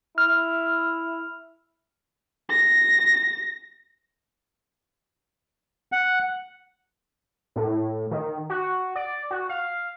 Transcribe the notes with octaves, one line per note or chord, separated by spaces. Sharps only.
E4 F6
A#6
F#5
A2
D#3
F#4
D5
F#4
F5